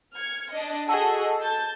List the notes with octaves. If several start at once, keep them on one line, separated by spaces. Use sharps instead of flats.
F6 G#6 C#7
D4 D#5
F#4 G#4 A4 D#5
A5 G6